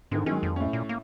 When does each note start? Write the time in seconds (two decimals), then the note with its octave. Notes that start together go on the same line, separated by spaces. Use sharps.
0.11 G#2 D3 D#3
0.26 D#3 F#3 G#3 C#4
0.43 F2
0.56 A2 C#4
0.73 A#2
0.89 A#3